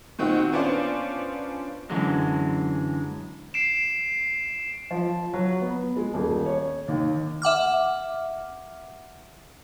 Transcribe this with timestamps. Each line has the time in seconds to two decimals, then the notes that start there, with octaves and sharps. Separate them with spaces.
0.19 A#2 D#3 C4 D#4 F#4
0.52 B3 C#4 D4 F4 C5 D5
1.90 F#2 D3 E3 F#3 G#3
3.54 C7 D7 E7
4.91 F3
5.33 F#3
5.62 B3
5.96 G#3
6.14 D#1
6.46 C#5
6.88 D#2
7.42 E5 F#5 D6 F6